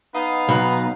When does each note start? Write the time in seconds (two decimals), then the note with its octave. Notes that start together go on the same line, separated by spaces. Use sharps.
0.14 B3 D#4 D#5 F5
0.49 B1 F#4 B5